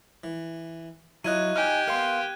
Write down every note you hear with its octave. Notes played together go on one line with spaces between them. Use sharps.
E3
F#3 E4 F4 D#5 F#6 G#6 D#7
D#4 G4 G#5 F6
B3 A#4 F5 F#5 C6